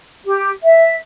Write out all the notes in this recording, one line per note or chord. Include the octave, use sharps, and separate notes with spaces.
G4
E5